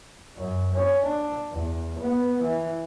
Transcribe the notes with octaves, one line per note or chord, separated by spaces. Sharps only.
F#2
C#4
D4
E2
B3
E3